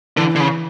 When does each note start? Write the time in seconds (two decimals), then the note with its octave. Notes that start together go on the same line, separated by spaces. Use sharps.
0.17 D3 E3
0.35 D3
0.40 C#3